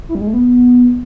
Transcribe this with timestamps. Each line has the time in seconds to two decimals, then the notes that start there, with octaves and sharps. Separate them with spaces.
0.09 E4
0.15 G3
0.21 G#3
0.27 A3
0.33 B3